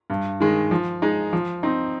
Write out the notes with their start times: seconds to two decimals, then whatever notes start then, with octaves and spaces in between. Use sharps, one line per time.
0.10 G2
0.40 D#3 G#3
0.71 F3
1.02 G#3 D#4
1.33 F3
1.63 C4 D#4